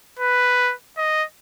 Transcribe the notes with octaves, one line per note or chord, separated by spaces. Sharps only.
B4
D#5